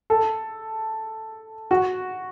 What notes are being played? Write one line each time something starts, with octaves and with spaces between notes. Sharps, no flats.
A4
F#4